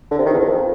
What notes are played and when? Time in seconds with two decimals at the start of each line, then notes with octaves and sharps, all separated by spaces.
0.11 D3
0.18 C3
0.26 D#3
0.33 E2
0.40 F2